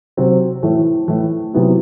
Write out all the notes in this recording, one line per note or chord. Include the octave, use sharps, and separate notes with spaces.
C3 F#3 C4
A2 E3 A3
A2 E3 A3
C3 F#3 B3 E4